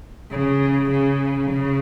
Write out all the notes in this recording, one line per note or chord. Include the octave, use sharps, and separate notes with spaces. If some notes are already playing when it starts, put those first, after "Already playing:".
C#3
C#3
C#3